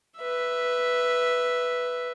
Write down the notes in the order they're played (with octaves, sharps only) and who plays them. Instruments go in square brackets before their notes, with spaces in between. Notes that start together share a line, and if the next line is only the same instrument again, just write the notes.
[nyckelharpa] B4 E5